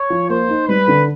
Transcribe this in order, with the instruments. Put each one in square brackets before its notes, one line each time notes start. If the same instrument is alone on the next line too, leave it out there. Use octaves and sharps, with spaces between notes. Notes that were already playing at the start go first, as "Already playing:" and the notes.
Already playing: [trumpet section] C#5
[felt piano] F3
[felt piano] A#3 [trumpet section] C5
[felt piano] D#4
[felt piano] G3 [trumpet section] B4
[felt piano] D3